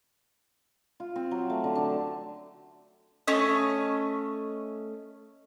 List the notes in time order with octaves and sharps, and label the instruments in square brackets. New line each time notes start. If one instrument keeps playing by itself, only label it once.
[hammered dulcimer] F4
C4
F#3
A3
D3
D4
[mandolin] A3 C#4 D#5